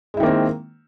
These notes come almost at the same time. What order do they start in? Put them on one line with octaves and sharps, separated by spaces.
G#3 E4 D#3 A#3 C4